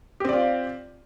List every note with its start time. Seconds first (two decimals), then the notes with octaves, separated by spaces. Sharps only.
0.20 G4
0.25 C4
0.29 D5
0.33 F4